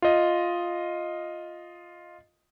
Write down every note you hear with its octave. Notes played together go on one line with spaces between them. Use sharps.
F4 D#5